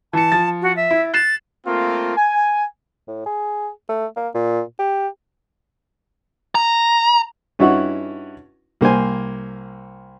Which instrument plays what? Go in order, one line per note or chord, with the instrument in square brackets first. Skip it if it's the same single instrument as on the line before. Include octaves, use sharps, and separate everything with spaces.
[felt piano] E3 C#7 [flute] A5
[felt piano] F3 A6
[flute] F#4
E5
[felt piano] E4
[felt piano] F#6 C7 E7 [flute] A6
[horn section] A3 A#3 C4 F4
G#5
[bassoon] A2
G#4
A3
A#3
A#2
G4
[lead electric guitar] A#5
[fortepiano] G2 C#4 D#4 E4 F#4
C2 A#3 C5 G#5